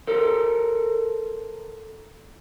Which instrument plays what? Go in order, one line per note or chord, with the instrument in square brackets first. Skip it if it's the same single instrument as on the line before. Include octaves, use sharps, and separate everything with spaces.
[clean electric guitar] A4 A#4 C5